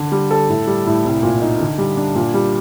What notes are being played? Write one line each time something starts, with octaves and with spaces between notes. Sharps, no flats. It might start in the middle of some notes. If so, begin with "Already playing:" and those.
Already playing: D3
G3
A4
A2
G3
A2
C2
A#2
D#4
D3
G3
D4
A#2
G3